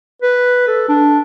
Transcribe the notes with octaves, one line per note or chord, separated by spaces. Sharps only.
B4
A4
D4